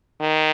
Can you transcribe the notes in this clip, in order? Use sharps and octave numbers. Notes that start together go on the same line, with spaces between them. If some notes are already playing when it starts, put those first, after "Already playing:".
D#3